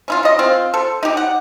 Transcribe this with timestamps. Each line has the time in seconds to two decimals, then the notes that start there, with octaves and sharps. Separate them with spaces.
0.08 C#4 E4 F4
0.23 C#3 D#5
0.39 C4 F4
0.74 A4 C5
1.03 D#4 G4
1.17 F#5